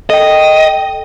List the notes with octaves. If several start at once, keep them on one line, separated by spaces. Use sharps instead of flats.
A4 D#5 G5